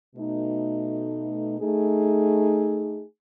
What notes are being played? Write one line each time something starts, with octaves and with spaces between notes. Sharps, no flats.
B2 A3 D#4
A3 D#4 G#4